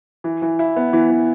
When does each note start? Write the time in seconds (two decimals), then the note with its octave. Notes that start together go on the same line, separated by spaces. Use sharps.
0.24 E3
0.42 E3
0.59 E4
0.76 B3
0.93 E3
1.10 E3